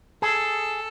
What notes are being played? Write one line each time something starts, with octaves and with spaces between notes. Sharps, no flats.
G#4 A4